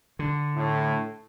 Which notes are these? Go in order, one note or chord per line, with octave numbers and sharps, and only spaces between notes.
D3
A2